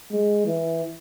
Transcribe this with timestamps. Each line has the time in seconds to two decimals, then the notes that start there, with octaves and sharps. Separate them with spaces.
0.11 G#3
0.46 E3